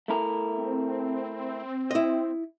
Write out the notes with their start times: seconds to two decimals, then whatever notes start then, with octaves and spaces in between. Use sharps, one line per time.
0.08 A3 E4 A#4
0.58 C4
1.91 E4 D#5